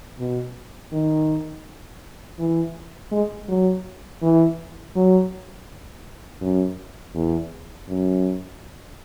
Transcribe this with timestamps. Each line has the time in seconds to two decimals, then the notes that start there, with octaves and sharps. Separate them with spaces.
0.19 B2
0.92 D#3
2.39 E3
3.12 G#3
3.48 F#3
4.22 E3
4.96 F#3
6.41 F#2
7.15 E2
7.88 F#2